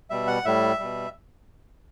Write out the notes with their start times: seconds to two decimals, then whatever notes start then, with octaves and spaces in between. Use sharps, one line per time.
0.10 B2 G3 E5
0.27 F#5
0.45 A2 G3 E5
0.79 B2 G3